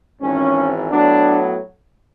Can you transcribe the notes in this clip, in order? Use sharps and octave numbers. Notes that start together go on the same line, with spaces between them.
G#1 G#2 E3 C#4
A2 F#3 B3 D4